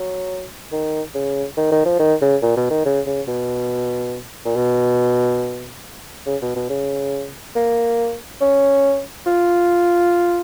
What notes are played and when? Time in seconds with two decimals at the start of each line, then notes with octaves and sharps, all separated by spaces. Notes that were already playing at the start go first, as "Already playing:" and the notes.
Already playing: F#3
0.72 D#3
1.15 C#3
1.57 D#3
1.72 D#3
1.85 F3
1.99 D#3
2.22 C#3
2.42 A#2
2.57 B2
2.71 D#3
2.86 C#3
3.07 C#3
3.28 B2
4.45 A#2
4.56 B2
6.27 C#3
6.42 B2
6.56 B2
6.70 C#3
7.56 A#3
8.41 C#4
9.27 F4